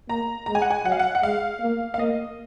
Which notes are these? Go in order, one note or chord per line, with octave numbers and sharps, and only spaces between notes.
A#3 A#5
G#3 A#5
G#5
F#5
G#5
F#3 F#5
F5
F#5
F#5
G#3 F5
A#3
F5
A#3 D#5